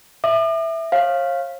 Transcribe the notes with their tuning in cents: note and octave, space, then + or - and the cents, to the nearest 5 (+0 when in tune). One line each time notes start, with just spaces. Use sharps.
E5 +0 D6 +45
C#5 -40 F5 +0